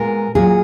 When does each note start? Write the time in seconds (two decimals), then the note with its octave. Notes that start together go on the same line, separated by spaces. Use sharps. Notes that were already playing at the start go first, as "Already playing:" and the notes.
Already playing: A#2 G#3 B3 A#4
0.35 A#2 F#3 A#3 G#4